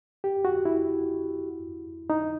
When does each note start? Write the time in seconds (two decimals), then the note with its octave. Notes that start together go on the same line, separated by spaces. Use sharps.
0.24 G4
0.45 F#4
0.65 E4
2.10 D#4